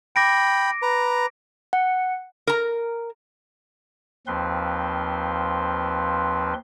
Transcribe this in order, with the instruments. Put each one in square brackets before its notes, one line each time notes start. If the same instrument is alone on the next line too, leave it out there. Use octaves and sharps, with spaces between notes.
[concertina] G5 B5 [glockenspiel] D6 A#6 D7
[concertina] B4 A#5
[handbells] F#5
[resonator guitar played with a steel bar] A#4 A#5
[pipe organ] D#2 F3 C4 B4 C6